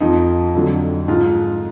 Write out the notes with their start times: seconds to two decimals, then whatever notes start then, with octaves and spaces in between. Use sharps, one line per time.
0.01 F2 F3 D#4
0.54 F2 D3 F#3
1.08 G#2 F3 F4